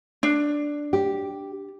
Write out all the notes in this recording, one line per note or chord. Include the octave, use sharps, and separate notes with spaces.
D4
G4